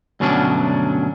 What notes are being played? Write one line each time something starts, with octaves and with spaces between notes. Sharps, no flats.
D2 G2 B2 F#3 C#4 D4